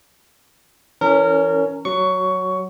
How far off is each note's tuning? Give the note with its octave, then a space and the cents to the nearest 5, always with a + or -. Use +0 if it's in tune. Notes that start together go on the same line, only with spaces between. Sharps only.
E3 +0 C#4 +15 A#4 -25
F#3 +5 C#6 +15